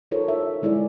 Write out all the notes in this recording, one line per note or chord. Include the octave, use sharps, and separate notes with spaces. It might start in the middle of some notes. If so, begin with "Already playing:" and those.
D#4 F4 A4 A#4 C5 C#5
E5
D3 G#3 E4 G#4 D5